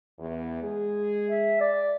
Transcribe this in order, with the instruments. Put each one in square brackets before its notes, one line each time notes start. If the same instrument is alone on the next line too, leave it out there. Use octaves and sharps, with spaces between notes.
[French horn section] E2
G#3 G#4
[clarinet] E5
D5